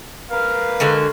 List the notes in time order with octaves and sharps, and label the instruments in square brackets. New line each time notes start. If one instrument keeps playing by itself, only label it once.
[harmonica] A#4 B4 F5
[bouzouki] D3 G#3 F#4